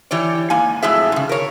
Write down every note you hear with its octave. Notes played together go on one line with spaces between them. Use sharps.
E3 G4 C#5 D5
G#2 A#3 G#5
F2 A2 F#3 G#3 G#4 E5
G#2 C#3
A#4 C#5